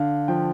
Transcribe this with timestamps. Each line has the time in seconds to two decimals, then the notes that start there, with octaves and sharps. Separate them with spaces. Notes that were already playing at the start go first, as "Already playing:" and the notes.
Already playing: D3 F5
0.28 F3 G5